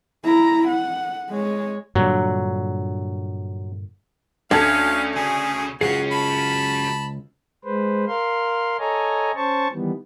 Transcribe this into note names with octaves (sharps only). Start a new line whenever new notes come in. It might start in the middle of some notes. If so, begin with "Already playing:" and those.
E4 A#5
F#5
G#3 C#5
G2 A#2 D3 F#3
D2 C#4 D4 A4 F5 B5 G#6
C#3 G#4
C#2 F#3 C#4 F#4 G#4 C7
A5 B5
G#3 B4 C5
A#4 F5 C6
A4 C#5 D#5 G#5 A#5
C#4 C5 A5 C#6
D#3 E3 G3 B3